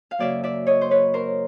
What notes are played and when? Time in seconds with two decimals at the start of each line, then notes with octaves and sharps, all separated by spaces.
0.11 F5
0.18 F#2 C#3 F#3 A#3 D5 E5
0.44 D5 E5
0.67 C#5 D#5
0.81 C5
0.91 B4 C#5
1.14 A#4 C5